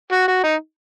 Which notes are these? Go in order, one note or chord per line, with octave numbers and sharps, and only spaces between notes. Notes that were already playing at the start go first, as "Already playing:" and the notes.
F#4
F#4
D#4